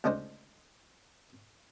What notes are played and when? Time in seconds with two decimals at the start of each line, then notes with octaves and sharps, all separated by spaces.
0.04 D2 C#3 G#3 D4 D#4 C5